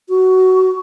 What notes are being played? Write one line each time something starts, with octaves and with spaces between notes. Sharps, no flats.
F#4